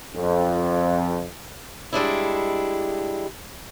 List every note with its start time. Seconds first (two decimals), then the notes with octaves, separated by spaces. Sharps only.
0.15 F2
1.93 G3 G#3 D4 E4